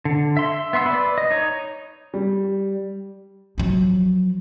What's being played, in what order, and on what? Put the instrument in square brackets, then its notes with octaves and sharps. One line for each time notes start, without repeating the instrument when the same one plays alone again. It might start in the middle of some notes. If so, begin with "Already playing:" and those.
[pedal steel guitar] D3
E5 C6
B3 E5 C6 E6
B4 D5
D#5
D#4 C#5
[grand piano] G3
[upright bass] F3 F#3